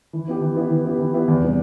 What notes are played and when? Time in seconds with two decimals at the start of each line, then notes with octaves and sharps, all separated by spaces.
0.13 E3
0.28 B3 E4 G4
0.42 E3
0.56 B3 E4 G4
0.71 E3
0.85 B3 E4 G4
0.99 E3
1.13 B3 E4 G4
1.28 E2
1.42 C3 G3 B3